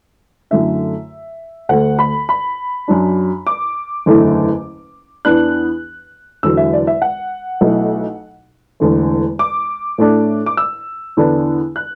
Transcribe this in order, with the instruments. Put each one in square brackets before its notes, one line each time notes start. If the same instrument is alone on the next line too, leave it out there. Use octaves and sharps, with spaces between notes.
[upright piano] F#2 D3 A3 E4 E5
D2 D3 A3 F#5
B5
B5
F#2 F#3 D4
D6
F#1 E2 D3 A3 E4
E2 E3 B3 D4 F#6
E1 E2 D3 F#3 E6
E5
D5
E5
F#5
B1 B2 A3 E4
E1 E2 D3 A3
D6
A2 A3 D4
D6
E6
E2 D3 B3 D4
F#6